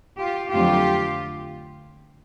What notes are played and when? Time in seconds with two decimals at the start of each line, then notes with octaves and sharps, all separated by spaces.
0.20 F4 G4
0.51 F2 D3 F#3 A3 F4 G4